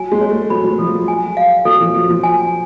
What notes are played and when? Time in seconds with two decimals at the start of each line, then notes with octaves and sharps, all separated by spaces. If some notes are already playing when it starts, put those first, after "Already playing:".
Already playing: F#3 G#5
0.12 G#3
0.21 C#5
0.30 A3
0.50 F#3 B5
0.64 F#3
0.78 F3 A4
0.93 F#3
1.08 G#5
1.37 F5
1.65 F#3 A4
1.80 F3
1.94 F#3 A4
2.09 F3
2.23 G#5